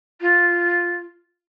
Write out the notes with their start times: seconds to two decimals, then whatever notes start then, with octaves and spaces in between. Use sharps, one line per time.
0.21 F4